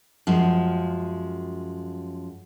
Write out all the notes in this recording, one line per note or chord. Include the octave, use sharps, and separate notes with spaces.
F#2 F3 G#3